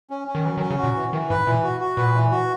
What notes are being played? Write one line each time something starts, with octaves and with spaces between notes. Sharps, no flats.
C#4
C#4
D#3
E3 F#3
D#3
C#4
C#3
F#4
A#2
E3
D#3 E3
G#2 B4
A#2 E3
F#4
F#4
A#2 B4
E3
F#4